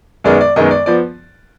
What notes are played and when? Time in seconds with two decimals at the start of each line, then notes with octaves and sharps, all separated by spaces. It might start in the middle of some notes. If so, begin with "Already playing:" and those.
0.24 F#2 D#3 G#3 B3 D5
0.41 D5
0.56 F#2 D#3 G#3 B3 D#5
0.71 D5
0.86 F3 B3 D5